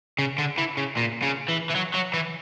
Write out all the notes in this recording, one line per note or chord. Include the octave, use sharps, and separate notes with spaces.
C#3
D3
E3
C#3
A#2
C#3
E3
E3
F#3
F#3
E3